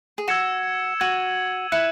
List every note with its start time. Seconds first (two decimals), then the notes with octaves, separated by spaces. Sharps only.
0.18 G#4
0.28 F#4 E6 G#6 C#7 E7
1.00 F#4 G#6 D#7 F#7
1.72 E4 F#6 C#7 E7